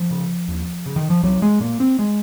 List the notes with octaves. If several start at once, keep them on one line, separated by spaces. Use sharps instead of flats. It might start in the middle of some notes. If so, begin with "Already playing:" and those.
Already playing: F3
C#3
D#2
C#3
D#3
F3
C2 F#3
G#3
A#2 A#3
C4
G#3